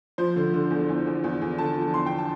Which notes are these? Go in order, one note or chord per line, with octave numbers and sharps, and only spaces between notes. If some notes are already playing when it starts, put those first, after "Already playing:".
F3 C5
D3
D3
E2
E2
E2
E2
E2
D3 A5
F3
E2 C6
G5
A5